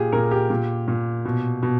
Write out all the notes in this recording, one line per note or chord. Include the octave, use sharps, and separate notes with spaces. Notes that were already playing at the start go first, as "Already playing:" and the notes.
Already playing: A#2 G4 G#4
A#2 A#4
G4
A#2
A#2
B2
B2